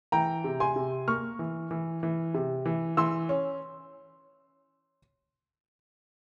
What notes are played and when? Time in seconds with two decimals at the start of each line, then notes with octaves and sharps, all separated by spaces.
0.12 E3 G5 A#5
0.44 C3
0.60 G#5 C6
0.76 C3
1.08 A#3 C#6 F6
1.39 E3
1.71 E3
2.03 E3
2.34 C3
2.65 E3
2.97 E3 C6 E6
3.29 C#4